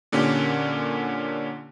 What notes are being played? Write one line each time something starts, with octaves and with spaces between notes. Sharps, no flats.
A#2 D3 A#3 C#4 G4